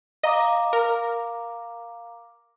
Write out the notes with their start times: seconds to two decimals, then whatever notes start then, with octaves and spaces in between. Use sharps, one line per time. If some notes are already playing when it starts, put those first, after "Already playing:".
0.23 D#5 F5 A#5 D6
0.73 A#4